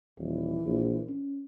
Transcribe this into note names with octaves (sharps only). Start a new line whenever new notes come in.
D#1 E3
A#1
C#4